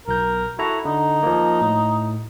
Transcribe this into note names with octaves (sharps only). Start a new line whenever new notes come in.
B1 A#4 G6
E4 F#4 A4 A#5
D3 D#4
F3 A#3
A2